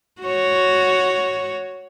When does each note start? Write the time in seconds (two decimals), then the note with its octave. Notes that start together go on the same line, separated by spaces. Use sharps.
0.22 F#4 C#5